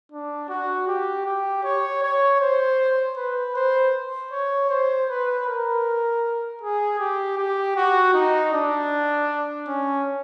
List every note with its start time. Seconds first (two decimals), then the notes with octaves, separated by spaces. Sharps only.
0.12 D4
0.49 F#4
0.87 G4
1.25 G4
1.64 C#5
2.03 C#5
2.40 C5
3.16 B4
3.56 C5
4.31 C#5
4.69 C5
5.09 B4
5.46 A#4
6.61 G#4
6.99 G4
7.37 G4
7.76 F#4
8.14 D#4
8.52 D4
9.67 C#4